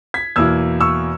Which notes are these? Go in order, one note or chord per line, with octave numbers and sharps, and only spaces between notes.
G#6 B6
E2 B2 A#3 E4 E6 G#6
C#6 E6